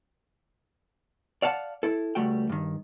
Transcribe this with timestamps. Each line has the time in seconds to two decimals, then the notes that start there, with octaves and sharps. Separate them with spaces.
1.42 D5 F5 F#5 A5
1.83 E4 A4
2.15 C#2 G3 A3 F#4 G5
2.49 G2 D#3